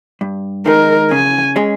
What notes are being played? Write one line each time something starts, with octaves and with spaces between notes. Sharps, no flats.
G2
D#3 G#3 D#4 A#4
C#3 G#5
G#3 C#4 G#4